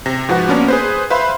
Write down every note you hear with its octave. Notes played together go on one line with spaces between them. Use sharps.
C3 A#6
G#2 F3 F#4 B4 F#5
A#3 B3 C#4 D4
G#4 B4 C5
B4 C5 E5 F5 B5 C6